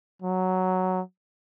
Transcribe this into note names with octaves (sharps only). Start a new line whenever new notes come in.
F#3